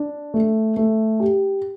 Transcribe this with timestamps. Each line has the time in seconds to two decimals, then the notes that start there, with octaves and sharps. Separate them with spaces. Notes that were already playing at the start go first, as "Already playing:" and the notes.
Already playing: D4
0.34 A3
0.77 A3
1.20 G4